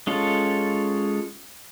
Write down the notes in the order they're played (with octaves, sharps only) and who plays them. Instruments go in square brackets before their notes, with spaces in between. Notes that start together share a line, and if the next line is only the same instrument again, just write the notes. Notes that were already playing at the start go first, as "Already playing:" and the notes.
[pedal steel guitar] G#3 C#4 F4 A4